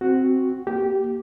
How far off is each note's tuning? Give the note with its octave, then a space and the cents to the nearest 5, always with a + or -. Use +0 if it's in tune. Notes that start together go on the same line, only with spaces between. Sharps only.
C4 +0 F#4 +0
A#3 +0 G4 -15